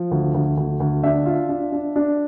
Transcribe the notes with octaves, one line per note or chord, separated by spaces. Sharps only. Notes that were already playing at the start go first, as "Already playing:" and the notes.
Already playing: F3
D2
D2
D2
D2
D4 E5
F4
D4
D4
D4